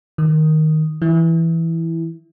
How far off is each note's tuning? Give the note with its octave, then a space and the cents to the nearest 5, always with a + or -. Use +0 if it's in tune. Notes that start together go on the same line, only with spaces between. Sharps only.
D#3 +0 D#6 +0
E3 +0 E4 +0